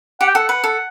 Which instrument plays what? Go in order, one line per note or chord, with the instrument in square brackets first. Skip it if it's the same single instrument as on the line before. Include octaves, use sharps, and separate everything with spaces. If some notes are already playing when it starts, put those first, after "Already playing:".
[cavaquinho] G4 [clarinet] F#5
[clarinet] G5
[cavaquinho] A4 [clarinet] F#5
[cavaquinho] B4 [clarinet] F#5
[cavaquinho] A4